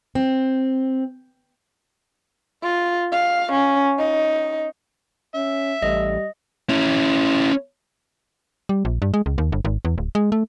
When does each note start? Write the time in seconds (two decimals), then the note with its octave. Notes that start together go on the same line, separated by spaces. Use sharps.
0.15 C4
2.63 F4
3.12 F5
3.52 C#4
3.99 D#4
5.35 C#4 E5
5.82 A1 G3 D#5
6.69 C#4 E4
8.69 G3
8.85 A#1
9.02 G2
9.14 G#3
9.26 C#2
9.38 D#2
9.52 G1
9.65 G#1
9.85 E2
9.98 D1
10.15 G#3
10.32 A3